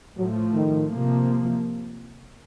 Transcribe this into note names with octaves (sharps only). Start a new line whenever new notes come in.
A2 F3 F#3 A3
D#3
C3 F3 A#3